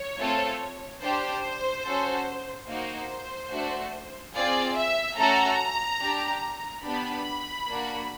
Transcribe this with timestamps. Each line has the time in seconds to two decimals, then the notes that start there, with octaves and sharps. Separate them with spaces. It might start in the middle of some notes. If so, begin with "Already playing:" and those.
Already playing: C#5
0.19 A3 C4 F4 A4
1.02 D4 G4 C5
1.85 C#4 F#4 A4
2.68 A#3 D#4 F#4 C5
3.52 A3 D4 F#4
4.35 C4 F4 G#4 D5
4.77 E5
5.18 A3 C#4 F#4 A4 A#5
6.01 D4 G4
6.84 B3 D4 G4 B5
7.68 A#3 D4 F#4